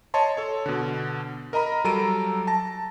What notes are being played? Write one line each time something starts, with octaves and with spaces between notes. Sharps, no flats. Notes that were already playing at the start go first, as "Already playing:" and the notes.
C#5 D#5 A5 C6
A4 C#5
B2 D3
A#4 D#5 A#5 B5
F#3 G3 A4 A#5 D7 D#7
A5 A#6